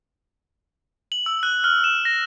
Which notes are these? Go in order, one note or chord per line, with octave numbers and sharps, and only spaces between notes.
F#7
E6
F#6
F6
E7
A#6